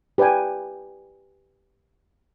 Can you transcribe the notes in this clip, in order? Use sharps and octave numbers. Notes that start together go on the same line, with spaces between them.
G4 B4 D5 G5 G#5